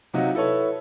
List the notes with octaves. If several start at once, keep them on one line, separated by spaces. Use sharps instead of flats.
C3 F#3 D#4 F4 F#4
E4 A4 B4 C#5